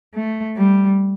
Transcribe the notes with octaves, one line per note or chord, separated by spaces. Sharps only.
A3
G3